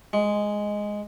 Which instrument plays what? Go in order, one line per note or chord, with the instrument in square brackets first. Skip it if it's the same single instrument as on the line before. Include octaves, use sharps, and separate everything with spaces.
[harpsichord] G#3